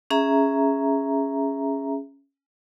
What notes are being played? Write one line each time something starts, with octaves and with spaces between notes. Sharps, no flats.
C#4 G#4 E5 A#5